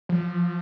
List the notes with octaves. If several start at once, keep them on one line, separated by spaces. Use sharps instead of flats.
F3